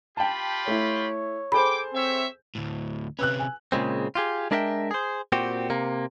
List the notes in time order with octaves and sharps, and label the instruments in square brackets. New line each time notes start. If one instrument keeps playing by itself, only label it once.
[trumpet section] F4 G4 B5 [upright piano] G5 A5
[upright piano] A3 E4 [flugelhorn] C#5
[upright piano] G#4 A4 C5 [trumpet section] G5 D6 [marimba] B5
[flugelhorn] C4 [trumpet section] C#5 E5
[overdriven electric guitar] D2 A2
[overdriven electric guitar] C3 C#4 [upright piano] B4 E6 F#6
[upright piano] G#5
[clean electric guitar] A#2 C#3 G#3 C4
F4 G4 G#4
G#3 D4 A#4 E5 F5 G5
G#4 C5
A#2 C4 F#4 G4
C3 A#3